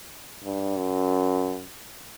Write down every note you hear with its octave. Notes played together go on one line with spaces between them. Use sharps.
G2
F#2